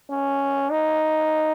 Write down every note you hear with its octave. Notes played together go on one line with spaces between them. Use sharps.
C#4
D#4